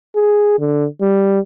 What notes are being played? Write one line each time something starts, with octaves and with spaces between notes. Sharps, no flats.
G#4
D3
G3